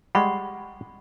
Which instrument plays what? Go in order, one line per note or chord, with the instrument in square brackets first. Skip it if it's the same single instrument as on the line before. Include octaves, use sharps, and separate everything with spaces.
[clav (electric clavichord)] G3 G#3 [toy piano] F#5 B5 C#6